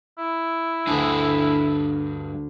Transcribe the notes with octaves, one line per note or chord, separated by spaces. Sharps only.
E4
D2 G2 D4 G#4